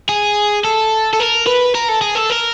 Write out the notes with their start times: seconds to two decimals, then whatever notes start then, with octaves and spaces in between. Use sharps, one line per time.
0.09 G#4
0.65 A4
1.13 A4
1.20 A#4
1.46 B4
1.74 A#4
1.88 A4
2.01 G#4
2.15 A4
2.30 A#4